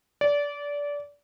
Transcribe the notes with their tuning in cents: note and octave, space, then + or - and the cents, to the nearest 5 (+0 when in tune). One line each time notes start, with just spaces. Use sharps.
D5 -20